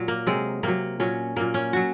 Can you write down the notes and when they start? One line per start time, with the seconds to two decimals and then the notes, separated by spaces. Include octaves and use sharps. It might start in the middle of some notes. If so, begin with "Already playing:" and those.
Already playing: A#2 F#3
0.08 A#3
0.27 C3 F#3 G#3
0.63 C3 F#3 A#3
1.00 A#2 F#3 C#4
1.36 A#2 F#3 A#3
1.54 C#4
1.73 F#3 F#4